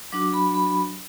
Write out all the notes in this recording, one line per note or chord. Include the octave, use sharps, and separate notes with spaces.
F#3 D4 F#4 D6
B5
B5